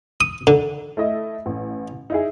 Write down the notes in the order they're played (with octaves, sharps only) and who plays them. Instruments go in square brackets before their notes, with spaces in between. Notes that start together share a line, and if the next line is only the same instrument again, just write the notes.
[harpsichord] D#6
D3
[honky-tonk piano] A3 E4 D#5
A1
D#4 E4 G#4